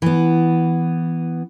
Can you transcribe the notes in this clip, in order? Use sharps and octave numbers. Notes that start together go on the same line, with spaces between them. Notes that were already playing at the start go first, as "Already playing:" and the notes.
E3 B3